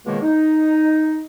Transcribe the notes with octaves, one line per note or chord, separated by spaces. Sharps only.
C#2 B2 D#3 G#3 A#3
D#4